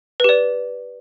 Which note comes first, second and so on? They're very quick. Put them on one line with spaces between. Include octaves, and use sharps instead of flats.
B4 G4 D5